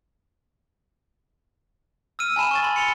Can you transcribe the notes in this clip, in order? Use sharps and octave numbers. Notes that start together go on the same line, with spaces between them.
E6 F6 D#7
G#5 A5 B5 E7
C#6 A6
B5 C6
C#7 F7 G7